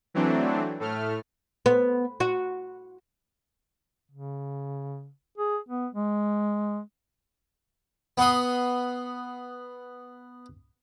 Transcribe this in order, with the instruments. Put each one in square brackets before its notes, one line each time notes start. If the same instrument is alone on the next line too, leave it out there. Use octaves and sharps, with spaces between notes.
[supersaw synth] E3 F#3 A3 C4 D4
A2 A3 F6
[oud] B3
F#4
[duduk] C#3
G#4
B3
G#3
[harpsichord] B3 F#5 C6 D#6